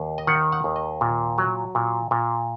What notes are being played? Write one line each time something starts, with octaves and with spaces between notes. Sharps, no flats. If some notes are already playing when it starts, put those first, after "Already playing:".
Already playing: D#2
D#5
D#3 F#5
F#5
D#2
D#5
A#2
F#3
A#2
A#2